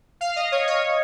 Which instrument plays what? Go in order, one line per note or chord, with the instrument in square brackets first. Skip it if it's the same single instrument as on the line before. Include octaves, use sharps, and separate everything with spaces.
[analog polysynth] F5
D#5
C#5
C#5